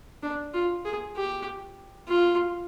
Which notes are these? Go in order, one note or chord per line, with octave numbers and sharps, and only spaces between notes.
D4
F4
G#4
G4
F4